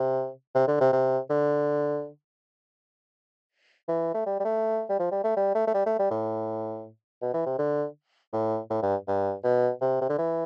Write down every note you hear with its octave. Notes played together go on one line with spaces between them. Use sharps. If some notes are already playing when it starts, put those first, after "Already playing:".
Already playing: C3
C3
D3
C3
C3
D3
E3
A3
G3
G3
A3
G3
F3
G3
A3
G3
A3
A3
G3
A3
G3
A2
B2
E3
C3
D3
A2
A2
G2
G2
B2
C3
C3
D3
E3